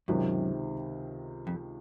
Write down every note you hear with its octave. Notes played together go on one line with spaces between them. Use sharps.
C#2 F#2 C3 D#3
F2